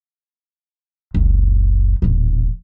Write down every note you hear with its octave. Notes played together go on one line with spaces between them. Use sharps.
F#1 C#2
D#1 A1